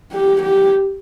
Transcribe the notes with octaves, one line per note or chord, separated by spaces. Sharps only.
G4
G4